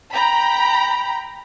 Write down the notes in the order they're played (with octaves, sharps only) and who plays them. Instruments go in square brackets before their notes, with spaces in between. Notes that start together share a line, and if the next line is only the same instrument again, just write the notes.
[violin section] G5 A#5 B5